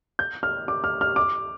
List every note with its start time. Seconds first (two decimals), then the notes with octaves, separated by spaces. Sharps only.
0.19 G6
0.43 F6
0.68 D6
0.84 F6
1.01 F6
1.16 D6